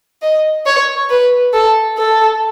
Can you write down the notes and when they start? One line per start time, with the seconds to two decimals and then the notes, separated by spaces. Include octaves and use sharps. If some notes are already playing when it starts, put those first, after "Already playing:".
0.22 D#5
0.66 C#5
1.10 B4
1.54 A4
1.98 A4